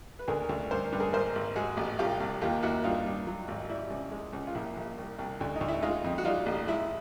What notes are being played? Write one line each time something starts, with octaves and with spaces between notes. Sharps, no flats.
B4
D2 G#4 A#4
D2
G2 A#4 C5
G2 B4
G#4 A#4
G#1 A#4 C5
G#1
G#3 F#4 G#4
A1
C2 F4 G4
C2
D#2 F4 G4
D#2 E4 F#4
G2 D#4 F4
G2
F#3
G#1
G3 E4
C#2
G#3
C#2
F4
A#1 E4
A#1
C2
C2
D2
D2 D#4
E4
G#3 D#4 F4
F2
F#4
G3 D#4 F4
A1
G#3 E4